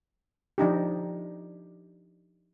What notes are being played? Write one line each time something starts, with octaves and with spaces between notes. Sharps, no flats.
F3 D4 D#4 G4